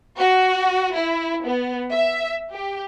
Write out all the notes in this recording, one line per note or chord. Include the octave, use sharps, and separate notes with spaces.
F#4
E4
B3
E5
G4